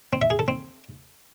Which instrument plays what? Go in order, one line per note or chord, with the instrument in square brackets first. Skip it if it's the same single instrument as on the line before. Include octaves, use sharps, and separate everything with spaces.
[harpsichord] C4
E5
G#4
A4
C4